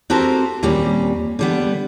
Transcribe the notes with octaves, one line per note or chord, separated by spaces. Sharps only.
C4 F#4 G4 A4 A#4 C5
D#2 A#2 G3 C4 C#4
D3 G3 B3